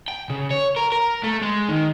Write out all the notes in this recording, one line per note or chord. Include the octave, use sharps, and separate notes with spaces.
G5
C#3
C#5
A#4
A#4
A3
G#3
D#3